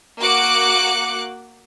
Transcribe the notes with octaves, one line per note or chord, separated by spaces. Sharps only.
A#3 F#4 D6 F#6 C#7